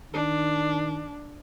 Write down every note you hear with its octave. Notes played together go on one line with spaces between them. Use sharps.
D#3 D4